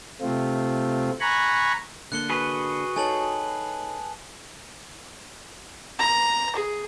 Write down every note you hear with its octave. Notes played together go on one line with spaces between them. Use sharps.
C3 A3 C4 F4
G#5 A#5 B5 C#6 F#6
D3 A#3 F#6 C#7 G7
F#4 G#4 B4
D#4 A4 C#5 G#5 A5 F#7
A#5
G#4